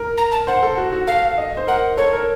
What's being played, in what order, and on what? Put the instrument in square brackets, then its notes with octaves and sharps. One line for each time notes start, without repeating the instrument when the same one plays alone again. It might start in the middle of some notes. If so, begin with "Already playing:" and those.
Already playing: [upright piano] A#4
[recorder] A#5
A5
[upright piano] C5 [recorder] F#5
[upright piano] A4
F#4
F#4
[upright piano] A4 [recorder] F5
[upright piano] D#5
C5
[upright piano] A#4 [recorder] F#5
[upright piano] A4 [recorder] C#5
[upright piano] A#4